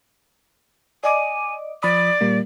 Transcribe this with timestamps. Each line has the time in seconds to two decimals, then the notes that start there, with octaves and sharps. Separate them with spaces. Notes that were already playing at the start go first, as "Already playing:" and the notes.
1.04 D5 D#5 G#5 D6
1.83 F3 D5 B5 D#6
2.21 A#2 G3 A#3